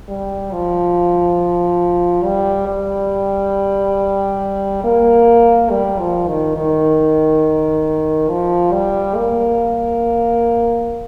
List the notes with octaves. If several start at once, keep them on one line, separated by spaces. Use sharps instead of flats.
G3
F3
G3
G3
A#3
G3
F3
D#3
D#3
F3
G3
A#3